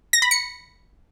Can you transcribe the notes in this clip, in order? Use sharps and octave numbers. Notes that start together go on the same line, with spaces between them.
A#6
B5
C#7